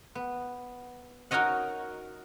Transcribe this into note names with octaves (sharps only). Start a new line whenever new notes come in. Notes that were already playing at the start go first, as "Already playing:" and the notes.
B3
D#4 F#4 A#4 C#5 D#5 F#5